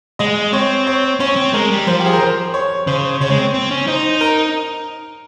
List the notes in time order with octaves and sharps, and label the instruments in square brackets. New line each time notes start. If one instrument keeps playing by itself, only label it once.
[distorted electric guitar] G#3 [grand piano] D#5
[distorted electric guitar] C4 [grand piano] C#5
[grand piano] C#5
[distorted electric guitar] C#4 [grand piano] C#5
[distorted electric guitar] C4
[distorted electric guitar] G#3 [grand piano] A#4
[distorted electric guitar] G3
[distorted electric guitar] F3 [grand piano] C5
[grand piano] G4
G#4
A#4
C5
C#5
[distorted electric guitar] C#3 [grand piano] C5
[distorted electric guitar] C#3 [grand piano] C#5
[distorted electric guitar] G#3
C4
C4
C#4
[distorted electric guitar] D#4 [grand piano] C5
[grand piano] A#4